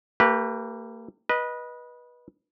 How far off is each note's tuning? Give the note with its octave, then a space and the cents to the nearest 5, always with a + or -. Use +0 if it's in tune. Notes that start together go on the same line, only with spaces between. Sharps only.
A#3 -45 G4 +0 B4 -15
B4 -20 D#5 +0